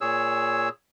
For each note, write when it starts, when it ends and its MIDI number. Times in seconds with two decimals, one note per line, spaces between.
0.01 0.69 46
0.01 0.69 68
0.01 0.69 73
0.01 0.69 88